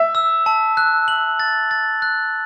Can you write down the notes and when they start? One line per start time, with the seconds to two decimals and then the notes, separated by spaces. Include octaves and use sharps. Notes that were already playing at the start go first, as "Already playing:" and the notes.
Already playing: E5
0.15 E6
0.46 A5
0.77 F#6
1.08 F#7
1.40 A6
1.71 A6
2.02 F#6